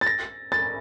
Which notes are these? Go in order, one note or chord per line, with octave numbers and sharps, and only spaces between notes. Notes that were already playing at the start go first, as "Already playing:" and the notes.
A6
A#6
A6